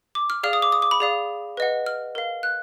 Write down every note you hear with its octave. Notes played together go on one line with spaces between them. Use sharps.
D6
F6
G#4 D5 F5 F6
D#6
D6
D#6
D6
B5
G#4 D5 F5
B4 D#5 F#5
F6
A#4 F5
F#6